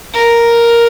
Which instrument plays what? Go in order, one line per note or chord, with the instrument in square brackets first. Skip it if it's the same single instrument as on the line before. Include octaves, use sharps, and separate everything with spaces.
[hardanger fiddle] A#4